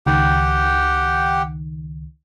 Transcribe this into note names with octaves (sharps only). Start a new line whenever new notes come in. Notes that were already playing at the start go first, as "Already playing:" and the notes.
C#2 D#3 G4 F#5 G5